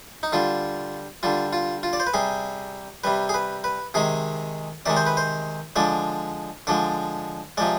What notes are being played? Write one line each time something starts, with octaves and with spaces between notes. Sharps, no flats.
D#4
D3 G3 F4
D3 G3 F4
F4
F4
D5
C5
B4
C3 G3 G#4
C3 G3 B4
G#4
B4
B4
C3 D#3 G#3 G#4
C3 D#3 G#3 D5
C5
B4
C5
D3 F3 G#3 D5
D3 F3 G#3 D5
C3 F3 G#3 D5